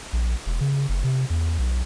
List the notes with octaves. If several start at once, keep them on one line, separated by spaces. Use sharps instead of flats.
A#1
E1
C#3
F#1
C3
E2
B1